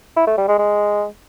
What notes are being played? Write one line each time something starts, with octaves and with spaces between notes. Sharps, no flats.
E4
A3
G3
G#3
G#3